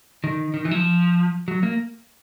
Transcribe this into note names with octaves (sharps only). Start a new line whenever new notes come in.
D#3
D#3
E3
F#3
F3
F#3
A#3